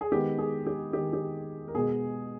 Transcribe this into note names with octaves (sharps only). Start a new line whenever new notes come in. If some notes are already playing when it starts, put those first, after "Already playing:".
G#4
D#3 G#3 B3 G4
G#4
G4
D#3 G#3 B3 G4
G4
A#4
B2 G#3 B3 G#4